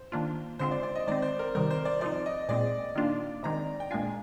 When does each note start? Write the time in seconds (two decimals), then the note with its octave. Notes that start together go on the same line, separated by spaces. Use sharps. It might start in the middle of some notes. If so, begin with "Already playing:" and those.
Already playing: C5
0.12 D#3 A#3 D4 F4
0.59 D3 G#3 C4 F4 C5
0.71 D5
0.83 D5
0.95 D#5
1.07 D#3 G#3 C4 D5
1.22 C5
1.39 A#4
1.55 C3 D#3 G3 A#4
1.70 C5
1.85 D5
2.01 F3 C4 D#4 D5
2.26 D#5
2.49 A#2 G#3 C4 D5
2.96 D#3 A#3 D4 F4
3.43 C3 D#3 G#3 A#5
3.80 G5
3.91 A#2 G#3 D4 F4 G#5